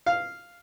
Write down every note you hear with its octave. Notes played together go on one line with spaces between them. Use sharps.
F5